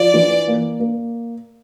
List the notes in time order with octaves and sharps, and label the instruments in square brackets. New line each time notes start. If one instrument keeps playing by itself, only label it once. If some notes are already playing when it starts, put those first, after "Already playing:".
Already playing: [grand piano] F3 [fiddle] D5
[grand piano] E3
A#3
A#3